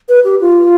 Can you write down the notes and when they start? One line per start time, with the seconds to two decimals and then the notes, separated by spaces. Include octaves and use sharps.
0.09 B4
0.24 G4
0.41 F4